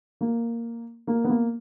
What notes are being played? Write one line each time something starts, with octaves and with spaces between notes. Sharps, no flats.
A#3
A#3
B3
A#3